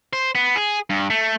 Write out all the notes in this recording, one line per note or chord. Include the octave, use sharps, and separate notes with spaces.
C5
B3
G#4
G2
A3